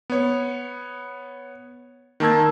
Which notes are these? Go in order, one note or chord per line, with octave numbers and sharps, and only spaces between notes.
B3 C#5
D#3 A#3 A5 E6 G#6